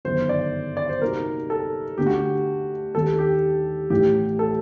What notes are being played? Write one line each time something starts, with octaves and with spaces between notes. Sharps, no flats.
G1 F#2 D#3 C5
D5
D5
C5
C3 G3 A#3 D#4 F#4 A#4
A4
D2 D3 A3 G4
F#4
G4
D#2 D#3 G3 A4
G4
A1 A2 G3 G4
A4